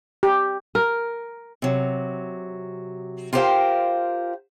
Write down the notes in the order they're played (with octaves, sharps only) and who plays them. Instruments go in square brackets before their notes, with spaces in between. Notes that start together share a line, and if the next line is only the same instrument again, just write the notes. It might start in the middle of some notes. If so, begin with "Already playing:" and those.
[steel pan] G4
[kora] A#4
[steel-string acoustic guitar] C3 F#3
F4 G4 A#4 C5 F5 G5